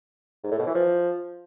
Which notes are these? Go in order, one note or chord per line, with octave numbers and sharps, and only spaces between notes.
G#2
A2
B2
E3
F3